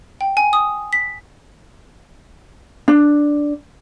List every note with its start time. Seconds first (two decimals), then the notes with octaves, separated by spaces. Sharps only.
0.21 G5
0.37 G#5
0.53 D#6
0.93 B6
2.88 D4